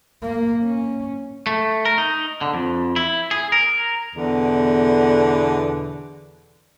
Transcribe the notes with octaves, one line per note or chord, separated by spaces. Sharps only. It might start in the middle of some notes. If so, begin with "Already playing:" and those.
A#3
C#4
A3
A#4
D#4
D3
F2
E4
G#4
A#4
E2 B2 D3